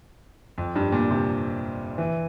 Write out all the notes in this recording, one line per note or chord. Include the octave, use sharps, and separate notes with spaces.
F2
G2
A#2
C3
E3